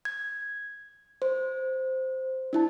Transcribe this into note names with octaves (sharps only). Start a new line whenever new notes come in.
G#6
C5
D4 E4 A5